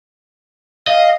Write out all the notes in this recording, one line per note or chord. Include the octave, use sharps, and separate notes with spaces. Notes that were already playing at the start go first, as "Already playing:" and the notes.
D#5 F5